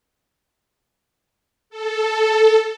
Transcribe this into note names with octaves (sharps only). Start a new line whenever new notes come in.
A4